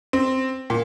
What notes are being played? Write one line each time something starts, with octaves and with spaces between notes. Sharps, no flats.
C4
A#2